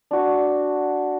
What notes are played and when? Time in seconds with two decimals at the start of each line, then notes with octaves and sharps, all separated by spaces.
0.11 D4 F#4